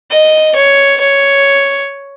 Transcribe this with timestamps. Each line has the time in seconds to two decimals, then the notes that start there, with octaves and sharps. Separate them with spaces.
0.11 D#5
0.56 C#5
1.00 C#5